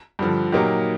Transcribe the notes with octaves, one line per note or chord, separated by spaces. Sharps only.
G2 D3 F3
A#2 F#3 A#3 D#4 G4